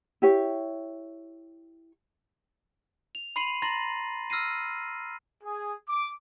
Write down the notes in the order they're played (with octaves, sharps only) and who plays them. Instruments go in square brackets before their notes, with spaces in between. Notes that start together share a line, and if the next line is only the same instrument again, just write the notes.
[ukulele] E4 G4 C#5
[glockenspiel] F7
B5 C6 C7 D#7 F#7
A#5 C6 A6 A#6 F#7
E6 F6 A#6 C7 D#7
[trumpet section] G#4
D6